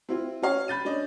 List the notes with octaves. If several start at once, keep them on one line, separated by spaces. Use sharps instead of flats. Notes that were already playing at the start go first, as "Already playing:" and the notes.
C4 E4 F4
C#4 F#4 C#5 F5
B5 G6 A6 D#7
C#4 D4 D5 D#5